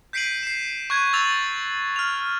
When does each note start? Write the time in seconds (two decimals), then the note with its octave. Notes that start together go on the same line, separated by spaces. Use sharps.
0.13 G6 B6 C7 D7 D#7 F#7
0.43 C7 E7
0.90 C#6 F#6 G#6
1.13 C#6 E6 A6 F7
1.96 F6 F7